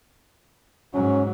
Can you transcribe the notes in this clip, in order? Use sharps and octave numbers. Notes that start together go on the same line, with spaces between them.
G#2 F#3 C#4